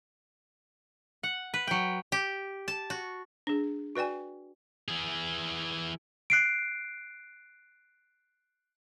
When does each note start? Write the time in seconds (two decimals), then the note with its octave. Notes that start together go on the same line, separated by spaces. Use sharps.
1.23 F#5
1.54 B4
1.67 F#3 G5
2.12 G4
2.68 A5
2.90 F#4
3.47 D4 G#4
3.96 F#4 B4 D5 G5 G#5
4.88 E3 G#4
6.30 F#6 C7 D7